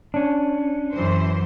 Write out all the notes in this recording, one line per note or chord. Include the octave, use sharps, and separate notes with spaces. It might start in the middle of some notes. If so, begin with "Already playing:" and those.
C#4 D4
F#2 E3 C5